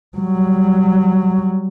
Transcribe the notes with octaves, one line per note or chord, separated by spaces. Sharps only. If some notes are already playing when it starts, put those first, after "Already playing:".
F#3 G3